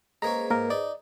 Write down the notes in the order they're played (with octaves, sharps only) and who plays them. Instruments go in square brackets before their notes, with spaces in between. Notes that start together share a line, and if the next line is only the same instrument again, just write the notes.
[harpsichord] G#3 A#3 C#4 [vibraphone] G#4 B4 C5 [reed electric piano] A#5
[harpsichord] G#2 [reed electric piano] A#3 A#4
[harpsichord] D#4 [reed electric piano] D5